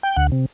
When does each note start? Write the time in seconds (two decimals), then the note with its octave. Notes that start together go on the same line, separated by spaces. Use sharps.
0.03 G5
0.16 D2 F#5
0.32 C3